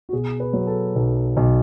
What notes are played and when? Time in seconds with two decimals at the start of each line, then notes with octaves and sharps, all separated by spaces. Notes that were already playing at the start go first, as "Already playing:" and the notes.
0.09 F#4
0.13 B2 G#4
0.40 B4
0.53 F#3
0.67 A4
0.96 B1
1.37 B1